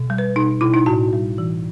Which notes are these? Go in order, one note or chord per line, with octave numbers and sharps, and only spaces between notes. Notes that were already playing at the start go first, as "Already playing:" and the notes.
Already playing: B2
G3
B4
B2 D#4
B2 E4
D#4
A2 F#4
G3
E3